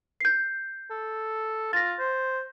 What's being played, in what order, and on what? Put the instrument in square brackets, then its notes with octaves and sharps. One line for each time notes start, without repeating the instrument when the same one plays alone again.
[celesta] G6 C7
[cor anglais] A4
[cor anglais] F4 [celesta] A6 A#6
[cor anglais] C5